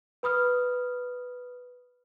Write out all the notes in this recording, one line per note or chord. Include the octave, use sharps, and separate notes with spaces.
B4 B5 D#6 F6